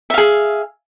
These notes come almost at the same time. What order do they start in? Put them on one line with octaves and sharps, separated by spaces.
E5 F5 G#4